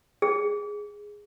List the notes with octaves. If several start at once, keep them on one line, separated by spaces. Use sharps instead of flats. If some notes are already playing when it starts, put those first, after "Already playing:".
G#4